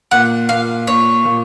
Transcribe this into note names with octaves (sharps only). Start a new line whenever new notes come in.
A#2 F#5
A#2 F5
A#2 C#5
A#2